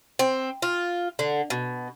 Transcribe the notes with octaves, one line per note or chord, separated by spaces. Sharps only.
C4
F4
D3
B2